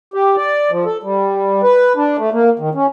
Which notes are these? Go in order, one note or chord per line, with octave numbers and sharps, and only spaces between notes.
G4
D5
F3
A4
G3
B4
D4
A3
A#3
D#3
C#4